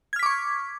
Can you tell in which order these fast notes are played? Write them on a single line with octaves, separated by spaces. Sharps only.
G#6 F6 B6 D6 C#6